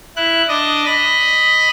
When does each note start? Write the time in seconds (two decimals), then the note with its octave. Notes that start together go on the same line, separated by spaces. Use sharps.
0.16 E4 F#6
0.48 D4 D#5
0.85 D#5 B5